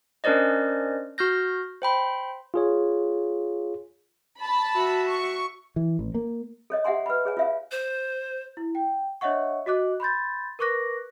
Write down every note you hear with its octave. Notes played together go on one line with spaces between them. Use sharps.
C#4 D4 A#4 C5 D5 D#5
F#4 F6 G6 A#6
C5 G5 B5 C6
F4 G#4 C#5
A5 B5
F#4 E5
C#6
E3
A1
A#3
A4 C#5 D#5
G4 E5 F#5 G#5 C6
B4 B5
G#4 C#5 G#5
F4 E5 F5
C5
E4
G5
D4 C#5 D#5 E5 F#5 C#6
F#4 D#5 D6 F#6
B5 C6 G6 A6
A#4 B4 C#6 D6 F#6 A#6